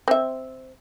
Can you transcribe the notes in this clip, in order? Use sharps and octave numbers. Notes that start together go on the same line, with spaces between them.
C4 E5